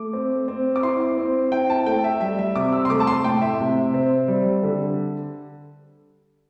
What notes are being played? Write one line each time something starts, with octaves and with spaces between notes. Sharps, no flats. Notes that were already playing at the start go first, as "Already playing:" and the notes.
Already playing: A3 D6
C4
C4
D6
E4 C6
C4
E4 G5
A5
A3 G5
E5
G3 E5
E5
C3 D6
E6
C6
A3 D6
A5
C6
A2 G5
E5
C3
C4
G3
D3